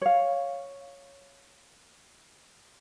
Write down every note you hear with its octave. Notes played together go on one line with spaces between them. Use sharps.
C#5 F5